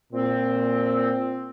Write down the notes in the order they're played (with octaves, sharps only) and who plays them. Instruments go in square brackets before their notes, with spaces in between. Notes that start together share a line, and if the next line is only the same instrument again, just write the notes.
[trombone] A#2 [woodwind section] C4